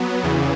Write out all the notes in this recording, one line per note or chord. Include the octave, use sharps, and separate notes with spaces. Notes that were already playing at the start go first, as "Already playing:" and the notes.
Already playing: F#3 B3
E2 C#3 E3